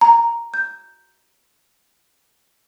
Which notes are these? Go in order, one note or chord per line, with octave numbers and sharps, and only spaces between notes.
A#5
G6